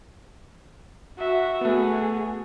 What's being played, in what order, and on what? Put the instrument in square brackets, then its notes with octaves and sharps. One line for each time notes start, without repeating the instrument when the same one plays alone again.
[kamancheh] F#4 E5
[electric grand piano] A3 B3 [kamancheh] F#4 G#4